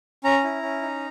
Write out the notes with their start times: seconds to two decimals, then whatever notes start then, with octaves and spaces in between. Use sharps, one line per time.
0.24 C#4 A#5
0.44 E4
0.63 C#4
0.82 D#4